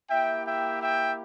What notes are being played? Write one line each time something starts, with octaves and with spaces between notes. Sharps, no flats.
A#3 E4 G4 E5 G5
E5 G5
E5 G5